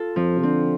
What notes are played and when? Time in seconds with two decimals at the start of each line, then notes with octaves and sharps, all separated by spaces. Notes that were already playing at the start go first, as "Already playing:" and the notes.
Already playing: F4 A4
0.16 F2 F3
0.38 C3
0.43 D3 C4